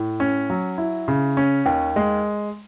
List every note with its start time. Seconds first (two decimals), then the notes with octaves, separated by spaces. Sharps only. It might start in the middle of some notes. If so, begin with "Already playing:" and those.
Already playing: A2
0.20 C#4
0.50 F#3
0.78 E4
1.08 C#3
1.37 C#4
1.66 D#2
1.96 G#3